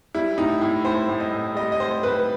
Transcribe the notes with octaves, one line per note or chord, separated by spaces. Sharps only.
G3 E4
A2 D#4
A2 E4
A2 C5
A2
D#5
A2
G3 D#5
D#5
A2 C5
A2 B4